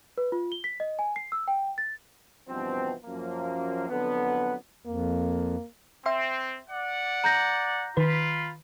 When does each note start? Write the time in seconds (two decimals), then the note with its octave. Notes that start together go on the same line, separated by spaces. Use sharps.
0.18 B4
0.32 F4
0.52 G7
0.64 B6
0.80 D#5
0.99 G#5
1.16 C7
1.32 E6
1.48 G5
1.78 A6
2.49 G2 B2 E3 F3 C4
3.05 F#2 F3 A#3
3.90 F2 D3 F#3 B3
4.86 F2 A#3
6.06 C4 E5 G5 C6
6.70 D5 F#5
7.24 A#5 G6 A#6
7.97 D#3 F4 B4 B5